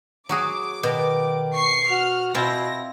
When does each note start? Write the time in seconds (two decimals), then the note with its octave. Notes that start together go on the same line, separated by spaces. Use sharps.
0.29 F#3 F#4 G#4 D6
0.83 B2 D#3
1.55 C#6 C7
1.90 F#4 F6
2.34 B2 C4 E4 F4 A#6